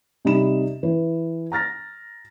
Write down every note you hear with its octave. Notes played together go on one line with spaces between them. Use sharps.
C3 G3 D#4 B5 E7
E3 B4
A#5 F6 A6 A#6